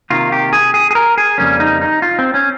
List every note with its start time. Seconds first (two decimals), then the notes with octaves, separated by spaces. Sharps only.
0.10 C3 D#3 A#3 F4
0.32 G4
0.53 G#4
0.74 G#4
0.91 G#4
0.95 A#4
1.18 G#4
1.38 F2 C#3 G3 A#3 C#4
1.60 D#4
1.81 D#4
2.02 F4
2.19 C4
2.34 C#4